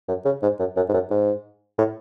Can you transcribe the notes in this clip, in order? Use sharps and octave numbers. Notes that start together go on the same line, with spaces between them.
F#2
C#3
G#2
F#2
F#2
G#2
F#2
G#2
A2